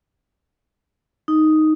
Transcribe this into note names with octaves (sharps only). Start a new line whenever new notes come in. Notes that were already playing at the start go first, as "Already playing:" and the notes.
D#4